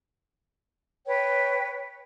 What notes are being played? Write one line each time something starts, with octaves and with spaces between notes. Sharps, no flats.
B4 C#5 G5